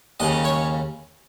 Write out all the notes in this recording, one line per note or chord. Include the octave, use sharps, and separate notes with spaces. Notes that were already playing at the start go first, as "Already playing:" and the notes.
D#2 C#3 D#5
C#5